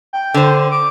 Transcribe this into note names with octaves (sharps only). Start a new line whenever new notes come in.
G5
D3 C5
D6